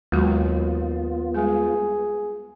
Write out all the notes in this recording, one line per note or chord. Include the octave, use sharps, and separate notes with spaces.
D#2 F#3 G#3 B3 F4 F#4
G3 G#3 G#4